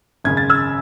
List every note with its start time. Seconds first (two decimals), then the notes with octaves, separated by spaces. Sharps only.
0.24 G#1 F#2 C#3 G#6
0.37 A6
0.50 E6 G#6